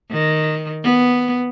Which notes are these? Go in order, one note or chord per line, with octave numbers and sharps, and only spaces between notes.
D#3
B3